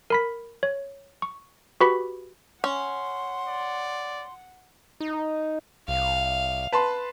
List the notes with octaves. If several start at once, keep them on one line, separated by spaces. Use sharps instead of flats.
A#4 B5 B6
C#5
C#6
F#4 G4 B4 B5 C#6 B6
C#4 F#5 C6
D5
D#4
C2 F5
B4 A5 C6